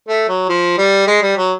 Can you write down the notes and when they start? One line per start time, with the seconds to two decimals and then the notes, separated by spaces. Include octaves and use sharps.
0.08 A3
0.28 F#3
0.49 F3
0.78 G3
1.07 G#3
1.22 G3
1.37 F#3